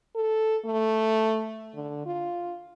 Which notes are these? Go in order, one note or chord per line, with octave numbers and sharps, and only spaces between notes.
A4
A3
D3
F4